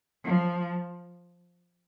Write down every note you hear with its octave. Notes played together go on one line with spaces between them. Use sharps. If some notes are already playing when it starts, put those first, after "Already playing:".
F3